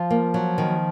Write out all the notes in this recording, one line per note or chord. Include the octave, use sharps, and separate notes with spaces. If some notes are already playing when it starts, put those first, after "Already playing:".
Already playing: F3 F4
A#3
F#3
D#3